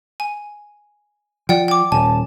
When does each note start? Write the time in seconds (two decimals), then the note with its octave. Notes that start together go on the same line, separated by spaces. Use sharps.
0.20 G#5
1.49 F3 D5 F#5 G5
1.68 G5 D6
1.92 D#1 G#5 A5